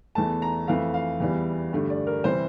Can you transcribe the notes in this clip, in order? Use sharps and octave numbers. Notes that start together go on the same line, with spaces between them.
E2 E3 A3 A5
A#5
F2 E3 A3 F5
F5
E2 E3 G3
G2 D3 A3
D5
A#4
C3 E3 G3 C5